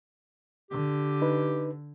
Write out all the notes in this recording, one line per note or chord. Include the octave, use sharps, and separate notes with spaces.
D3 G4
D#4 B4